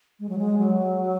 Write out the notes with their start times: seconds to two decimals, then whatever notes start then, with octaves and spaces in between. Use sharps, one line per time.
0.20 G#3
0.29 F#3
0.38 G#3
0.58 F#3